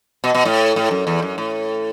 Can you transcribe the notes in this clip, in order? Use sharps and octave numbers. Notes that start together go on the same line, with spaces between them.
B2
B2
A2
A2
F#2
E2
F#2
A2